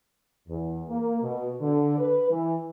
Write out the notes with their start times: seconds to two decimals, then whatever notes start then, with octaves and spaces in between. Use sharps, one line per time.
0.48 E2
0.89 A#3
1.22 B2
1.61 D3
1.98 B4
2.29 E3